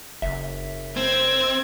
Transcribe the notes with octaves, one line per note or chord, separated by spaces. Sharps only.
F#1 E5
C4 G#6